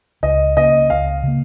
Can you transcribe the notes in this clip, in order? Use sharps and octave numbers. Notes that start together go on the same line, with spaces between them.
C#2 D#5
C#3 A#3 D#5
C#2 F5
C#3 A#3